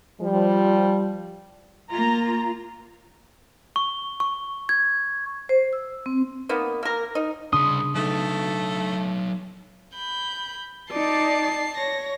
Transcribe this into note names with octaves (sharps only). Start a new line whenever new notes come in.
F3 G3
A#3 F4 A#5
C#6
C#6
G#6
C5
E6
C4
A#3 B3 D#4
A#3 A#4
D#4
C2 C#3 D4 C6 D#6
F#3 A3 D#4
B5 G6
D#4 D5 A5 C7
C#5 A#6